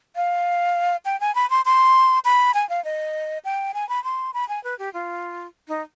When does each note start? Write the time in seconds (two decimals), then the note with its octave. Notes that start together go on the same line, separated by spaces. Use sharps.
0.16 F5
1.05 G5
1.20 G#5
1.35 B5
1.50 C6
1.65 C6
2.25 B5
2.54 G#5
2.69 F5
2.85 D#5
3.45 G5
3.74 G#5
3.89 B5
4.04 C6
4.34 B5
4.49 G#5
4.64 B4
4.79 G4
4.94 F4
5.68 D#4